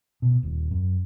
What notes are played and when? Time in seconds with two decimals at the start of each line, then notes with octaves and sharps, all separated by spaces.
0.22 B2
0.43 D#1
0.71 F#2